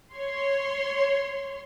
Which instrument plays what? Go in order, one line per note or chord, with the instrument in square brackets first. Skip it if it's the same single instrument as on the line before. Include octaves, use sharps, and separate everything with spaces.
[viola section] C#5 C6